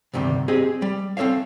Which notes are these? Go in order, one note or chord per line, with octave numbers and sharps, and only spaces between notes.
D2 G2 C3 D#3 G3
C4 G4 G#4 D#5
G3
C4 A4 C#5 E5 F5